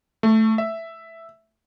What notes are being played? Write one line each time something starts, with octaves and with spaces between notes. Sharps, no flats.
A3
E5